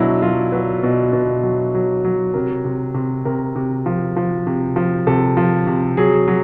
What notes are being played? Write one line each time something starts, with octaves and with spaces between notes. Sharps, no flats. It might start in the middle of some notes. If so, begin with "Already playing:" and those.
Already playing: B2 F#3 D4 E4
F#3 F4
F#3 B4
B2
B2
F#3
F#3
F#3
C3 A#4
C3
C3
C3 A#4
C3
F3
F3
C3
F3
C3 A4
F3
C3
F#3 G#4
F#3